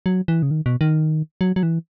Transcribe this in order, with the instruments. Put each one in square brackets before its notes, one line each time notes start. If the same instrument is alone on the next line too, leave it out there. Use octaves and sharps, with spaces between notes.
[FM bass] F#3
E3
C#3
D#3
B2
D#3
F#3
F#3
E3